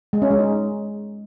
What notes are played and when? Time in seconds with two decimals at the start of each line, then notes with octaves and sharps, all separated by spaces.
0.13 G#3
0.22 C#4
0.31 G#3
0.39 D#4